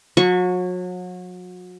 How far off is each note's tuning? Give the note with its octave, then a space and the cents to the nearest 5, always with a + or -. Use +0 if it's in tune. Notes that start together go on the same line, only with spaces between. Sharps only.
F#3 -35 C#6 +0